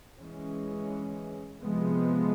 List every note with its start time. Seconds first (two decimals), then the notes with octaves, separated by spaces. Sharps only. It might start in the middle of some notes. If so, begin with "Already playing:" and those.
0.18 E3 G#3 C#4
1.61 C3 F3 G#3 B3